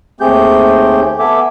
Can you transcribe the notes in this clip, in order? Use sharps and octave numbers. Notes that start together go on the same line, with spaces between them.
D#2 A3 C4 G4 G#4 G6
B3 A4 E5 G#5 D6